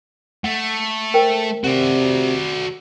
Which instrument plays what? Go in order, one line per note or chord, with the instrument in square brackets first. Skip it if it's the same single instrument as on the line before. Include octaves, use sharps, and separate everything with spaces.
[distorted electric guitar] A3 [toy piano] F#5
[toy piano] A#4 C5 G5
[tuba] C3 [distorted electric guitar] F#4 D5